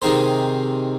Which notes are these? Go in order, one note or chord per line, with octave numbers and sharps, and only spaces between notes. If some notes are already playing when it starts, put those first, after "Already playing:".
C3 D#3 G#3 C4 D#4 C5